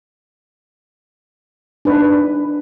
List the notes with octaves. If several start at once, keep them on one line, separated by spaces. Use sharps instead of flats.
D4 D#4 B4